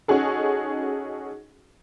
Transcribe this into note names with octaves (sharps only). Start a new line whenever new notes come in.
C#4 D#4 F#4 G#4 A4